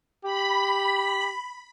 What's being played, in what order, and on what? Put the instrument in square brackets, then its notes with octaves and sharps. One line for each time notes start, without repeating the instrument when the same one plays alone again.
[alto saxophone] G4 [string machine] B5